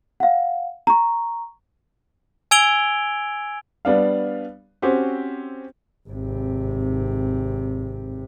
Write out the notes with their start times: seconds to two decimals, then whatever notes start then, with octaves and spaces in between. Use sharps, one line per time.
0.20 F5 F#5
0.87 A#5 C#6
2.51 G#5 E6 G#6 D7 F7 G7
3.85 G3 B3 D4 F5
4.82 C4 C#4 F#4 G4 C5
6.09 G#1 C3